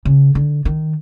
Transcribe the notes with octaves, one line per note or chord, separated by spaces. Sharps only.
C#3
D3
D#3